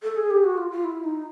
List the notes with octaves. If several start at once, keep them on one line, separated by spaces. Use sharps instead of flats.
A4
G#4
G4
F#4
F4
F4
E4
D#4